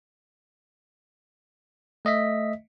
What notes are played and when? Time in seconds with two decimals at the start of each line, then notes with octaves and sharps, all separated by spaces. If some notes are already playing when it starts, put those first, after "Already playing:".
2.05 A3 D#5 E5 B6